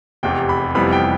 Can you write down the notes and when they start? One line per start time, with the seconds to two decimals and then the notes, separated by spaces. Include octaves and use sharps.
0.23 F1 E2 C3 G5
0.49 B5
0.75 F1 F2 E3 G3 B3 B5
0.92 G5